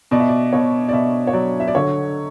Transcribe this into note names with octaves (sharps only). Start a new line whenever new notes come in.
B2 D5
E5
D5
B2 C#5
D5
B2 E5
C#5
F#3 D5
E5
D5
D3 C#5